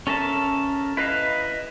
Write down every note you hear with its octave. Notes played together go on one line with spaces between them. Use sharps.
C#4 A4 A#4 E5 A5
E4 B4 D#5 F5